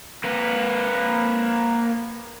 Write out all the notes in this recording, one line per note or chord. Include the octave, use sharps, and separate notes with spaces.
A#3 B4